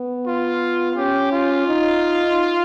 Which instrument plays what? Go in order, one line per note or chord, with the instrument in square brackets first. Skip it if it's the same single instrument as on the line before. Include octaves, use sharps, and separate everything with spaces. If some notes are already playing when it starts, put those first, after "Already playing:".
Already playing: [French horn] B3
[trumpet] F4
[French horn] C#4 [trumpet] G4
[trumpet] F4
[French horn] D#4